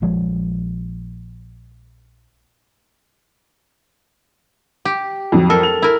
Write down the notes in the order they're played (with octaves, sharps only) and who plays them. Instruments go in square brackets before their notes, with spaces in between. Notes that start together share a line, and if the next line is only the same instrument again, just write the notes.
[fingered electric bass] A#1 F3 G#3
[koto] G4
[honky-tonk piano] F2 F#3
[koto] A4 A#4
[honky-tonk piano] F7
[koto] E4 A#4